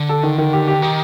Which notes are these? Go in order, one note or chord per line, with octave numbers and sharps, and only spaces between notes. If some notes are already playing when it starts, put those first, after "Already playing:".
Already playing: D3
A4
D#3
D#3
G4
G4
D#3 G4